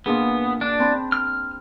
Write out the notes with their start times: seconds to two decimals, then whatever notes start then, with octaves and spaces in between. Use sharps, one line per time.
0.06 A#2 B3 D4 G#4
0.61 D4
0.80 C4 A5 B5
1.12 F6